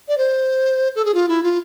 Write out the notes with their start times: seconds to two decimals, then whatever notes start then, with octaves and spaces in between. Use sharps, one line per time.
0.08 D5
0.18 C5
0.95 A4
1.05 G#4
1.14 F4
1.29 E4
1.43 F4